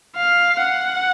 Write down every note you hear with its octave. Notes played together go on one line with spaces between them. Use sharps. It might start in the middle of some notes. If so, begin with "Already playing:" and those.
F5
F#5